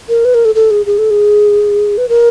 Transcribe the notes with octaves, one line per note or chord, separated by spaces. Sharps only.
A#4
B4
A#4
A4
A4
G#4
G#4
A4
G#4
B4
A#4